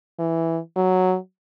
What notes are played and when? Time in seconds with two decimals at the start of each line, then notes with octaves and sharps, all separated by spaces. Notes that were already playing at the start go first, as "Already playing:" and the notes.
0.19 E3
0.76 F#3